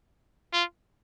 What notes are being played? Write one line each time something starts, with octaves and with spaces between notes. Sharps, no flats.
F4